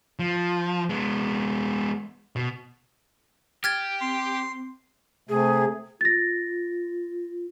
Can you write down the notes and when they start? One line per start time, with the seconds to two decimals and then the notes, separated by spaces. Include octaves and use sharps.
0.19 F3
0.89 G#3 B3
2.36 B2
3.64 G4 F6 G#6 A6
4.01 C4 C6
5.29 C3 A3 G#4
6.01 F4 A6 A#6